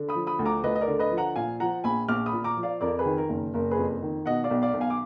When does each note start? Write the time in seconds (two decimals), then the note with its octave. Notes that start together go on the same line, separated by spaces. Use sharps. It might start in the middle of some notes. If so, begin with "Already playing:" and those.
Already playing: D3
0.09 B5 D#6
0.15 F3
0.27 B5 D#6
0.39 D2
0.45 A#5 D6
0.63 D2 B4 D#5
0.76 D#5
0.81 A#4 D5
0.88 D3
0.99 B4 D#5
1.11 F3
1.17 F#5 A#5
1.36 A#2 F5 G#5
1.60 F3 F#5 A#5
1.84 A#1 G#5 B5
2.08 A#1 D6 F6
2.26 B5 D#6
2.33 A#2
2.44 A#5 D6
2.57 F3
2.63 D5 F5
2.81 F2 A#4 D5
2.99 G#4 B4
3.05 D#3
3.18 A#4
3.29 F#1
3.54 F#1 A#4
3.71 G#4 B4
3.77 F2
4.03 D#3
4.26 B2 D#5 F#5
4.44 D5 F5
4.51 B1
4.62 D5 F5
4.74 B1
4.81 F5 G#5
4.90 D6